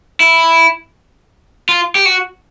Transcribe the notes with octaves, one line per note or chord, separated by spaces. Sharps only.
E4
F4
G4
F#4